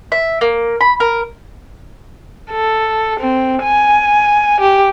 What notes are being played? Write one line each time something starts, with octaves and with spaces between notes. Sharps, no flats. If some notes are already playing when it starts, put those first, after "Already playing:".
E5
A#3
B5
A#4
A4
C4
G#5
G4